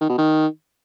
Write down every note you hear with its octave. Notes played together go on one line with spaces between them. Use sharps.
D#3
B2
D#3